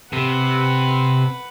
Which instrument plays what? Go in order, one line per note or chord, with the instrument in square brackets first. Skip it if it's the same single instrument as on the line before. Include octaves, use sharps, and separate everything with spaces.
[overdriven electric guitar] C3 [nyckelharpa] B4 F#5